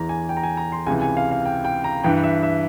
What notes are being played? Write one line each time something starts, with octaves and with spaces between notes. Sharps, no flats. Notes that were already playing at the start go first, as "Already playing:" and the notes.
Already playing: E2 E3 A#5
G#5
G5
A#5
G#5
A#5
C6
C#2 C3 E3 G#5
G#5
F5
F5
G5
G5
A#5
G2 E3 G5
E5
E5